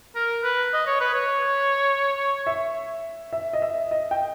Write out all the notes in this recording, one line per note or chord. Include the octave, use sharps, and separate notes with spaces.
A#4
B4
D#5
C#5
B4
C#5
E5
E5
D#5
E5
D#5
G5